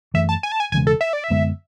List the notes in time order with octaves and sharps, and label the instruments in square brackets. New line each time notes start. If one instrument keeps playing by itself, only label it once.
[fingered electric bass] F#2 E3 A3 [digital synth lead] E5
[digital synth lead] A5
G#5
A5
G#5
[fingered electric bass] E1 E2 C#3 G#3 [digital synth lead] G#5
[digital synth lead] A4
E5
D5
E5
[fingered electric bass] F#2 D3 G#3 B3